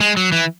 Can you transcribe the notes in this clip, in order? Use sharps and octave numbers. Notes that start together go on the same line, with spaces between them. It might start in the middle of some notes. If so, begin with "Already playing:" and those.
G#3
F#3
E3